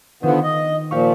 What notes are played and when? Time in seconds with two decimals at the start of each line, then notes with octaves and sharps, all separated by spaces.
0.23 D3 D#3 F3 B3
0.43 D#5
0.91 A#2 F3 G4 F5 C#6